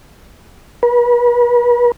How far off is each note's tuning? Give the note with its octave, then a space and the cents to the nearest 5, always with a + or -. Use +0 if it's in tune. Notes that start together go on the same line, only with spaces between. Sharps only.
B4 -40